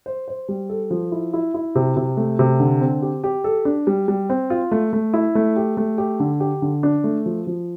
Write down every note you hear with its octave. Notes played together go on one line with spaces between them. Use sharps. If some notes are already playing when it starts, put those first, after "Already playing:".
C5
C5
G3
A4
F3
E4
E4
E4
C3
C3
A3
C3
D3
C4
G4
G4
A4
D4
G3
G3
C4
F4
A3
A3
E4
A3
G4
A3
G4
D3
G4
D3
D4
A3
F3
F3